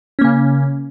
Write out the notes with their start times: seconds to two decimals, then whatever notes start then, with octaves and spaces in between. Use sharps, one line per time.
0.19 C#4
0.21 A#3
0.24 C#3